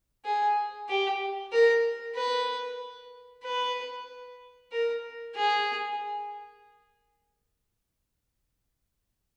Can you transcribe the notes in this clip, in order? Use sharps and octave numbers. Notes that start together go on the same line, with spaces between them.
G#4
G4
A#4
B4
B4
A#4
G#4